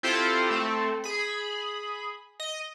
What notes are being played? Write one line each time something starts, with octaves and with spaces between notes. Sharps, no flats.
C4 E4 F4 G4 A4 C5
A3 C4 A4
G#4 B5
D#5